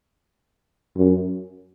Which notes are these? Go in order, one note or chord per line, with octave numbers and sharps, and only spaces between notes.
F#2